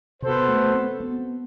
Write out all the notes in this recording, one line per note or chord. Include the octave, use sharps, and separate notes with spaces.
C3 B3 F#4 A4 C5
A3
C4
B3